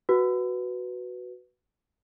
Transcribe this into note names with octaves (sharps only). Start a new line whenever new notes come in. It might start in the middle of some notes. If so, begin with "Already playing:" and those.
F#4 B4